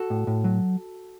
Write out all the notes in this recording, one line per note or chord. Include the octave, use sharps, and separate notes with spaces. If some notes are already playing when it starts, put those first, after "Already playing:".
Already playing: F#4 A4
A2
A2
F#3